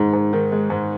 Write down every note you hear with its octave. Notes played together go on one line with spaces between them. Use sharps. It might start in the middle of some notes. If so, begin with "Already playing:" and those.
Already playing: G#2 D#3 G#3
G#2
D#3
G#3
G#2